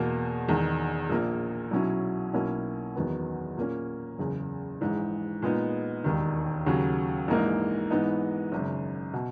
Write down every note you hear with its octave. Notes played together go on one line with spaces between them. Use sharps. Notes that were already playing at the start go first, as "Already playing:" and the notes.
Already playing: E2 B2 A#3
E1 E2 D#3
A#1 A#2 A#3
B1 B2 F#3 C#4 E4
B1 B2 A#3 C#4 E4
F#1 E2 D#3 F#3 B3
A#2 A#3 C#4
F#1 E2 C#3
A#1 G#2 E3
A#2 G#3 B3 D#4
E1 D#2 D#3
D#2 C#3 F#3
A#1 G#2 E3 A#3 D#4
G#2 E3 B3 D#4
G#1 F#2 C#3
B2